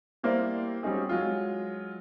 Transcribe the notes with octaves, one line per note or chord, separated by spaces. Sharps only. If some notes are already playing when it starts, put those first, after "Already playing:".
G3 A#3 E4 C5 D5
F#3 G3 C4 C#4 D#4 G#4
F#3 G#3 F4